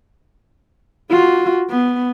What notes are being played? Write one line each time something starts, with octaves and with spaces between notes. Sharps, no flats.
F4 F#4
B3